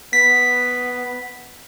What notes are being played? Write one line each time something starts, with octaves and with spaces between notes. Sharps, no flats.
B3 B6